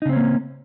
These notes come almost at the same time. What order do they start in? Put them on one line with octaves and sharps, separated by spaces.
D#4 C#3 C4 C#4 A#3